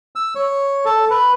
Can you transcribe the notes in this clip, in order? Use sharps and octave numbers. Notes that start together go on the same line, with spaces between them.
E6
C#5
A4
B4